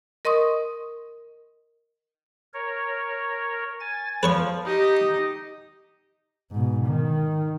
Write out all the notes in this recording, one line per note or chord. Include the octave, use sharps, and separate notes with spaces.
A#4 D#5 C6 C#6 D#6
A#4 C#5
G#5 A6
F3 B4 C#5 C#6
D#4 G4 D#5
G#2 B2
D#3